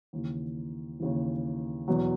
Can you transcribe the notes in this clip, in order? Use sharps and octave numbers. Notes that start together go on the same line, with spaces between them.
D#2 C#3 E3
D#2 C#3 E3
E2 B2 F#3